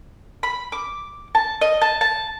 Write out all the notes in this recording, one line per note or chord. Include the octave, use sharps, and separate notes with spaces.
B5
D6
A5
D#5
A5
A5